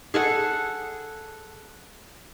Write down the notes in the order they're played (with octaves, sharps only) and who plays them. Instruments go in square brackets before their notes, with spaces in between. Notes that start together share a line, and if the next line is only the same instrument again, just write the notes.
[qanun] G#4 A4 F#5